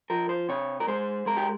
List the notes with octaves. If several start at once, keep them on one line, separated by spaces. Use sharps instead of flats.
F3 A#4
C5
C3 C#5
A#4
G#3 C5
G#3 A#4
G4